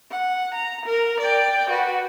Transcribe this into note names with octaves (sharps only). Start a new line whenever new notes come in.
F#5
A#5
A#4
D5 G5
F#4 B4